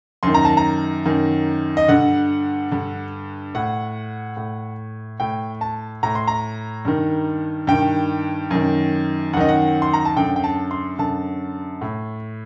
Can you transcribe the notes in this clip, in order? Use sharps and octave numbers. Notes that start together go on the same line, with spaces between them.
F#2 D#3 C6
A#5
A5
A#5
F#2 D#3
D#5
G2 D3 F#5
G2 D3
A2 F#5
A2
A2 G5
A5
A2 A#5
C6
A#5
G2 D#3
G2 D#3 G5
F#2 D#3
F#2 D#3 D#5 F#5
F#5
C6
A#5
A5
F#2 D3 G5
G5
A5
C6
F#2 D3 A5
A2